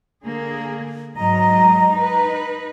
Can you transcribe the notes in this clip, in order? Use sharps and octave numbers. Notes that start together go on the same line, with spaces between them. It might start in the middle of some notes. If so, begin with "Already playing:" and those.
D3 A#3 G#4
G#2 F#3 D#5 A#5
D#4 B4